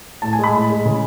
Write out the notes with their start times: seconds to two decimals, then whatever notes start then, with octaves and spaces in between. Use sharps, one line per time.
0.22 A2 A5
0.33 G#5
0.39 G#3 B5
0.54 A2
0.70 G#3
0.85 C#3